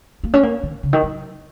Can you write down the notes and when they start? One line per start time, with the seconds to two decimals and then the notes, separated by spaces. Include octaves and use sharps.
0.24 A#3
0.34 C#4
0.43 A#3
0.63 D#3
0.83 C#3
0.93 D#3
1.03 F#3